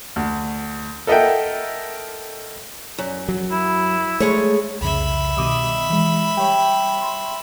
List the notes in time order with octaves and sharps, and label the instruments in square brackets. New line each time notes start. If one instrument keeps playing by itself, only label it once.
[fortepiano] D2
A4 A#4 D#5 E5 F#5 G5
[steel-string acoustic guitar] F#2
[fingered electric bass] F#3
[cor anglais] E4
[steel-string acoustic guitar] G#3 G#4 C#5 [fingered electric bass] A3
[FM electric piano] C2 F2 C#3 [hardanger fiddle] E5 B5
[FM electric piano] B2 D#3 G3 [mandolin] D#5 D6
[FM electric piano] E3 G#3
[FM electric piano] G3 [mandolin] G4 C#5
[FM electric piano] C6